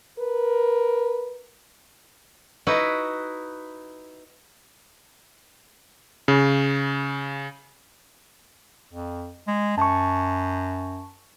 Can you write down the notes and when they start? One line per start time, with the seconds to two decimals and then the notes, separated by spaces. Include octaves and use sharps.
0.19 A#4 B4
2.67 D#4 E4 F#4 B4
6.28 C#3
8.93 F2
9.47 G#3
9.78 F#2 A5 C#6